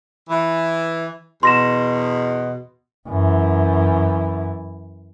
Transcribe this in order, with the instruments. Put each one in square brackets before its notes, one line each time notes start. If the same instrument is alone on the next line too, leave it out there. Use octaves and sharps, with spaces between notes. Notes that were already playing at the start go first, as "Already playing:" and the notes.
[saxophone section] E3
[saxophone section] E2 B2 [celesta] C6 A#6 E7
[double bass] F#2 E3